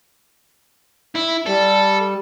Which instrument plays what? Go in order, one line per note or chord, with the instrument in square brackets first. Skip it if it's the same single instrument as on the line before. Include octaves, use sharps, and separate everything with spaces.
[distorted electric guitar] E4
[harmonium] G3 [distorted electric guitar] A4